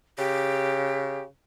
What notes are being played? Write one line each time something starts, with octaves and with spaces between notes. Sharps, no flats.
C#3 G4